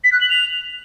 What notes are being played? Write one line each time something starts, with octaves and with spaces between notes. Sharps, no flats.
B6
F#6
F#7
F7